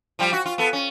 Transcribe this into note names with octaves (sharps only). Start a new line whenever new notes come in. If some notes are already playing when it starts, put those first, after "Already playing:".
F3 G3 F4
F#4
F4
B3 A4
C#4